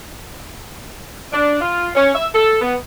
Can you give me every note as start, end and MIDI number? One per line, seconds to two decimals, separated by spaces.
1.33 1.59 62
1.61 1.89 65
1.95 2.10 61
2.15 2.27 76
2.34 2.57 69
2.61 2.75 59